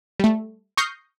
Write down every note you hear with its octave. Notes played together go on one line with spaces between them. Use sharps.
G3 A3
C#6 D#6 F6 G6 A#6 C7